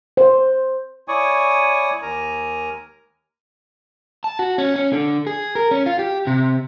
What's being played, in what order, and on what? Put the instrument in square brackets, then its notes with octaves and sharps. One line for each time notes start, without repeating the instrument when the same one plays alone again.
[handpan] C5
[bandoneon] E4 C#5 D5 G#5 C#6 D#6
D#2 A#4 G#5 A#5
[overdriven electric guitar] A5
F#4
C#4
C#4
D3
G#4
A#4
C#4
F4
G4
C3